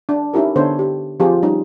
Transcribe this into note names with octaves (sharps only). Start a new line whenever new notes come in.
D4
C#4 D#4 E4 G4 A#4
D3 B3 D4 A4 C5 C#5
G4
F3 C4 F4 G4 G#4 C5
G3 C#4 D#4